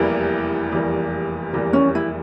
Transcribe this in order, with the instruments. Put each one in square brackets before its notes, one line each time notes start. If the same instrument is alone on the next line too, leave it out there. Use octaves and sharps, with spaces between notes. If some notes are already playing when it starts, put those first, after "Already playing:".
Already playing: [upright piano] F1 E2 E3 G3 A#3 [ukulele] E4
[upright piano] F1 E2 E3 G3 A#3
F1 E2 E3 G3 A#3
[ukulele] C#4
E4